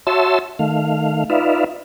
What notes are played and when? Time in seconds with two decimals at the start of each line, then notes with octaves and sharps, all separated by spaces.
0.07 F#4 C#5 E5 A5 C6 E6
0.59 D#3 A3 F5
1.30 D#4 F4 B4 D5 E5 F5